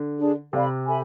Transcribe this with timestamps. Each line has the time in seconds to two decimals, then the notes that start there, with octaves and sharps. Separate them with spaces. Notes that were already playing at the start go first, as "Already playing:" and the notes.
Already playing: D3
0.19 D4 G#4 D5 A5
0.53 C3 A4 D5 F5 B5
0.87 A4 E5 G#5 B5